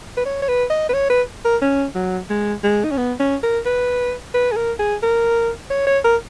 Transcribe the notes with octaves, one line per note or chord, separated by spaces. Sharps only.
B4
C#5
C#5
B4
D#5
B4
C#5
B4
A#4
C#4
F#3
G#3
G#3
D#4
C#4
B3
C#4
A#4
B4
B4
G#4
A#4
G#4
A#4
C#5
C#5
A#4